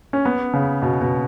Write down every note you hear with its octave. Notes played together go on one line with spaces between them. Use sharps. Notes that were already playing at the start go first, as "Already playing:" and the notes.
C#4
B3
C#3
B2
B2